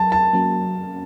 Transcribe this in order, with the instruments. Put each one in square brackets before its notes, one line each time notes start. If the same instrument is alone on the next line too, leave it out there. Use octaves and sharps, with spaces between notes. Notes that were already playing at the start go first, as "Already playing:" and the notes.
Already playing: [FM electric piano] F#3 A#4 [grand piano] A5
[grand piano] A5
[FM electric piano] F#3 A#3 C#4 F#4 A#4